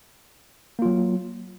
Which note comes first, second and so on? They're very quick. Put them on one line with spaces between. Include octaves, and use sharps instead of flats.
A#3 F4 F#3